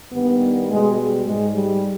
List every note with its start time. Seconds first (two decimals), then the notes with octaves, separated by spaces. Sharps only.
0.11 G2 D#3 G3 B3
0.69 B2 G3 G#3
1.26 G#2 G3 G#3
1.55 G3